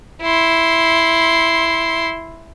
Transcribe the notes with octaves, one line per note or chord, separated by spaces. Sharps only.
E4 C6